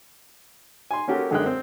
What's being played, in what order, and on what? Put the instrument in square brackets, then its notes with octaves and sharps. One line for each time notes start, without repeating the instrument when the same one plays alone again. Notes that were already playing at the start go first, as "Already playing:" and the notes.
[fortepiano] G#5 C6
A#3 C#4 F#4 G4 A4 A#4
F#2 D3 G#3 A#4 G5 F#6
C4